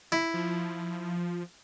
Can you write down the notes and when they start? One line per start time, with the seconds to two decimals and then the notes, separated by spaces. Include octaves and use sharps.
0.12 E4
0.34 F3